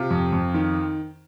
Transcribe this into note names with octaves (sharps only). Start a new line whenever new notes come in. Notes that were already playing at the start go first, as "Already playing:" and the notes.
Already playing: C3 F4
F2
F2
D#3